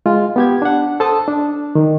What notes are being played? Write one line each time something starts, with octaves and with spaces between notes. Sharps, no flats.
G#3 F4
B3 G4 G#6
D4 F#5
A4 C5 A5 D#6
D4
D#3